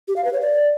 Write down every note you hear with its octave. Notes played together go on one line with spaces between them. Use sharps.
G4
F5
B4
C#5
D5